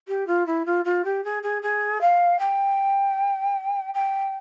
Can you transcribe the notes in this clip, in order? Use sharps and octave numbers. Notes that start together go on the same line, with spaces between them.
G4
F4
E4
F4
F4
G4
G#4
G#4
G#4
F5
G5
G5